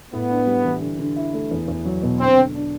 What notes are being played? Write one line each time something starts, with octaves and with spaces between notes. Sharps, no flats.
A2 B3
D4
G3
E3
D3
D3
E4
A3
E2
E2
F#3
B2
D3 C4
D3
D4